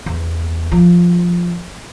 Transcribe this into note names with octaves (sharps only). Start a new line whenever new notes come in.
E2
F3